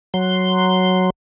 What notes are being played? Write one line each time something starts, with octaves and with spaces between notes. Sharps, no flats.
F#3 C6